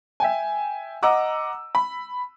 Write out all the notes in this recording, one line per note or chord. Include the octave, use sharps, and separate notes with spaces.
E5 G5 G#5
D#5 F#5 A#5 D6 E6
B5